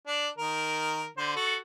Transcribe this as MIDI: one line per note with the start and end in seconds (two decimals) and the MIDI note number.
0.07 0.28 62
0.38 1.08 51
0.38 1.08 70
1.17 1.33 50
1.17 1.33 72
1.36 1.56 66
1.36 1.56 69